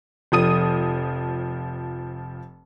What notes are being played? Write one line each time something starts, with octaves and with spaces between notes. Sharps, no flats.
F1 F3 D#6 D#7